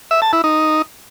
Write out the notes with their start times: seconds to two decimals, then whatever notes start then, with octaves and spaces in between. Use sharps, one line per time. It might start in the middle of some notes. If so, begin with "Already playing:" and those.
0.11 E5
0.22 A5
0.33 E4
0.44 D#4